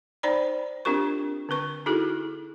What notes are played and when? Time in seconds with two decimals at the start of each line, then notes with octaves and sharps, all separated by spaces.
0.23 D#4 C5 D5 G5 A#5 B5
0.85 C4 D4 F4 G4 A#4 C#6
1.49 D3 C4 B4 C#6
1.86 D#4 E4 F#4 G#4 A4